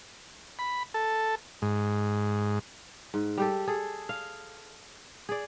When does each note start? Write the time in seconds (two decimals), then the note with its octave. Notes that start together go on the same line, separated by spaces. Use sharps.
0.59 B5
0.94 A4
1.62 G#2
3.14 G#2
3.38 G3 G4 A4
3.67 G#4 A4
4.09 F5
5.29 G#4 D5